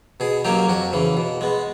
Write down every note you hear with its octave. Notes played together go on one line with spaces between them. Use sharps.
B2 G#4
F#3 A#3 C#4 G4
F2 F#4
C#3 E3
B2
G#3 B3